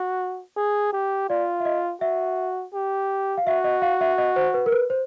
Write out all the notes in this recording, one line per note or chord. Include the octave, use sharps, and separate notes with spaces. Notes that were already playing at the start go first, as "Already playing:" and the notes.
Already playing: F#4
G#4
G4
F4 D5
E5
D#5
F#4 E5
G4
F5
F#4 E5
D#5
F5
E5
D#5
C5
B4
A#4
B4
C5